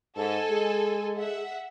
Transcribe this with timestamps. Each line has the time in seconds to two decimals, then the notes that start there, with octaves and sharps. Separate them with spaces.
0.17 G#2 A4 G#5
0.49 G#3 G#4
1.18 E5 F#5